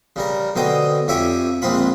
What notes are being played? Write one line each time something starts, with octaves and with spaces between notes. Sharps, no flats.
C#3 G3 A#4
B2 D3 C5 D#5 G5
F2 G4 C#5 E5 G#5 D6
A#1 G#3 C4 F4 B5